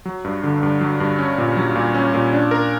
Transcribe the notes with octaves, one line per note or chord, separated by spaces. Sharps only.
F#3
G2
D3
G2
F#3
G2
C#4
A#2
F#3
A#2
C#4
A#2
D4
A#4